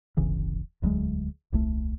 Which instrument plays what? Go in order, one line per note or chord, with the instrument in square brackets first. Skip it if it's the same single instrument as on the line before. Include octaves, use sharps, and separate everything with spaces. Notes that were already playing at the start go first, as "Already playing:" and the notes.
[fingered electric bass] D1 G1 C#3 E3
E1 D2 F#3 G#3
D#1 C2 A3